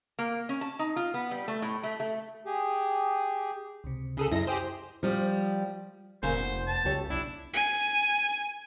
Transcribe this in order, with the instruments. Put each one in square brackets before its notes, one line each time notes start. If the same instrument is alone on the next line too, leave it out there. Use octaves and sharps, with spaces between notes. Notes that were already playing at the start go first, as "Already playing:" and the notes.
[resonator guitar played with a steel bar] A#3
C#4
A5
D#4
F4
B3
G3
A3
A2
A3
A3
[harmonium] G4 G#4
[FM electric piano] C#2 C3
[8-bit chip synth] C#3 G#4 A4
[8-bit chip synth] F#2 A#6 [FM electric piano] E4 D#5 E5
[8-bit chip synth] G4 G#4 C5
[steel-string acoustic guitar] F3 G3
[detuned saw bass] F1 [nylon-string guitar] A#2 C#3 [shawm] C5
[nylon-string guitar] B3
[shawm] A5
[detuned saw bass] C#2 [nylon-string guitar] G4 A4 C#5
[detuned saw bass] B1 [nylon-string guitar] D4 [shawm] E4
[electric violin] G#5